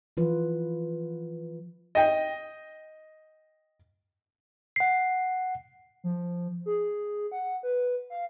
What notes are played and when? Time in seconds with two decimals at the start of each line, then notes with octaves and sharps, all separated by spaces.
0.17 E3 F3 F4 B4
1.95 D#5 G5
4.76 F#5 C7
6.04 F3
6.66 G#4
7.32 F#5
7.63 B4
8.10 F5